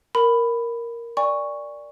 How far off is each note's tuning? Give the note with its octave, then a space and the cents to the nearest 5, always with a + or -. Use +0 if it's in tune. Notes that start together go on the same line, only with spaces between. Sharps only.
A#4 +0 B5 +5
D5 +0 G#5 -35 C#6 +0